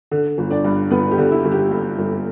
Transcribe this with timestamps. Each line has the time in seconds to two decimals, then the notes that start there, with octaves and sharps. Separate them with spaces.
0.11 D3
0.38 G1
0.51 D4 D5
0.65 G2
0.91 G1 B3 B4
1.11 G4
1.18 D3
1.31 E4
1.45 G1
1.52 G4
1.71 G2
1.99 G1